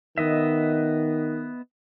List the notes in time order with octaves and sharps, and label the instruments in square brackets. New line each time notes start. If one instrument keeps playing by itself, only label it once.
[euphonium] D#3 [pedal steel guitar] B3 D#5 E5